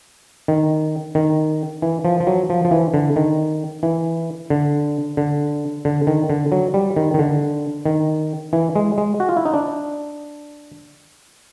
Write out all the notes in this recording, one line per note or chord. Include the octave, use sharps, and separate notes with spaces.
D#3
D#3
E3
F3
F3
F#3
F3
F3
E3
D3
D#3
E3
D3
D3
D3
D#3
D3
F#3
G3
D#3
D#3
D3
D#3
E3
G#3
G#3
F#4
F4
E4
D#4
D4